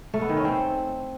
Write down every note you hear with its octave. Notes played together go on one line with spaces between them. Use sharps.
A3
B3
D#3
C#4
C4